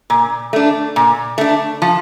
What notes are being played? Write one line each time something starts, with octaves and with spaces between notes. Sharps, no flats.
A#2
A3 D4
A#2
A3 D4
F3